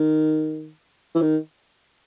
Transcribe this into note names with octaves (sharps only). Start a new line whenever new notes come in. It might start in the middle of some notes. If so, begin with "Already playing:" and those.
Already playing: D#3
E3
D#3